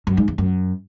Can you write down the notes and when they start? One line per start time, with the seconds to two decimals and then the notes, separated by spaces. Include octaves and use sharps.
0.07 F#2
0.17 G#2
0.28 E2
0.38 F#2